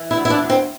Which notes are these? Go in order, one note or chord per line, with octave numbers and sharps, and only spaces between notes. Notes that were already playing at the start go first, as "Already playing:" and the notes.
Already playing: E3
E4
D2
E4
D4
D2
C4